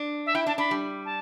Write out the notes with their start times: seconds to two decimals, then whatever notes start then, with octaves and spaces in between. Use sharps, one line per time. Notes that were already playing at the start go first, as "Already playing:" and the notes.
Already playing: D4
0.26 E5
0.35 E4 G5
0.46 D4 A5
0.58 D4 B5
0.71 G3
1.05 A5